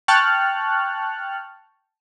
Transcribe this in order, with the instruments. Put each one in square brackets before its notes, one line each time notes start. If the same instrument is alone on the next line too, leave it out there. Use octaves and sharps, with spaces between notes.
[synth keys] G5 A5 C#6 F6 F#6